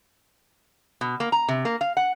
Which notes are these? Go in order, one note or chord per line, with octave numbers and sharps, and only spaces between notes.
B2
A#3
A#5
C3
A#3
F5
F#5